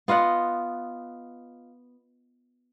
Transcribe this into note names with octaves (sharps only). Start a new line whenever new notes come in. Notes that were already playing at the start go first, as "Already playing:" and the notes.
B3 F4 D#5 F#5